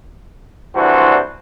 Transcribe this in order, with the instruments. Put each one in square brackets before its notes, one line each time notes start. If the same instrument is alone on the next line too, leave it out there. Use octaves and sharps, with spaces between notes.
[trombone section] C2 E3 D4 F#4 C5